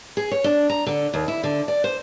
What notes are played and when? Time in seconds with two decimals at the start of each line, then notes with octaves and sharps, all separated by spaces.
0.17 G#4
0.31 C#5
0.44 D4
0.70 A#5
0.87 D3
1.14 D#2
1.28 E4
1.43 D3
1.68 D5
1.84 C5